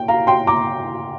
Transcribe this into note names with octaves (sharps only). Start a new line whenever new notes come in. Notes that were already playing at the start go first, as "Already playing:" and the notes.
Already playing: G5
F5 A#5
G5 C6
A#5 D6